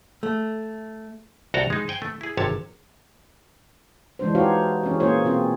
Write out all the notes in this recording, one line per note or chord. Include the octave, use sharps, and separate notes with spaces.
A3
C2 F#4 G5 A5 A#5
G#3 D#4
C5 G5 G#5
A3
E4 G#4
G#1 C3 G4 C#5 A5
E3 G#3 D4 C5
D#4 F#4 G4 C5 C#5 F5
E3 C#4 G#4
A#2 A#3 C#4 G#4 C5 C#5
B2 C4 F4 G#4